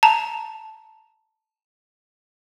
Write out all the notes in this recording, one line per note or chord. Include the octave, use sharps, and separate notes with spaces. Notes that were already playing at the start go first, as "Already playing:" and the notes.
A5 A#5